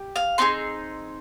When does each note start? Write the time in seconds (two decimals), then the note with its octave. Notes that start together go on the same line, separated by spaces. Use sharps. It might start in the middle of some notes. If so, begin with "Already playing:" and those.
Already playing: G4
0.16 F5
0.38 C4 D#4 G#4 C6